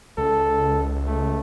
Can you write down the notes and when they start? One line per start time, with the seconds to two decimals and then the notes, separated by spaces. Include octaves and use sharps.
0.18 C#2 A4
1.07 A3